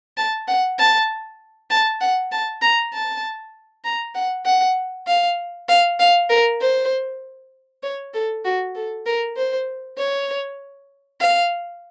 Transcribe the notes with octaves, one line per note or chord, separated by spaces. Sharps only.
A5
F#5
A5
A5
F#5
A5
A#5
A5
A#5
F#5
F#5
F5
F5
F5
A#4
C5
C#5
A4
F#4
A4
A#4
C5
C#5
F5